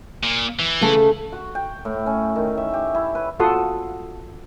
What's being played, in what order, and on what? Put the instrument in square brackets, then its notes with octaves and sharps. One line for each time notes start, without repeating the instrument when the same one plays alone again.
[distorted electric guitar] A#2
E3
[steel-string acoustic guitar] C#3 A3 A4
[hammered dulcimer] F#4
G5
A2
C#4
D#3
E5
G4
E4
B4
[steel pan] F4 F#4 A4 F#5 C6 D#6